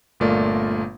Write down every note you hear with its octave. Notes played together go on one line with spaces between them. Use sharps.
G1 A#2 A3 F4 A#4 D5